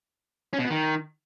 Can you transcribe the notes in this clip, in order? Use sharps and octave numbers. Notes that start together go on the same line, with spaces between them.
C#4
B2
B3
D#3